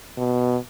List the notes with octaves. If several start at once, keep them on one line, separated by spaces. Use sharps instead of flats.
B2